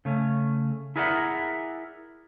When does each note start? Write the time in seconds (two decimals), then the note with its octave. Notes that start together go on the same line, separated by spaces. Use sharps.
0.05 C#3 A3 C#4
0.96 E4 G#4 A#4 D5 E5 F#5